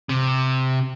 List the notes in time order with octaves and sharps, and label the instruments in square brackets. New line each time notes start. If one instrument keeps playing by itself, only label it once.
[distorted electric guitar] C3